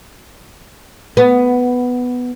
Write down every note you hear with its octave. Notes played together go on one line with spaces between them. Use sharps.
B3